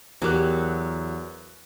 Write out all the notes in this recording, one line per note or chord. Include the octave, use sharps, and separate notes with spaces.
E2 F#3 G4 A#4 F#6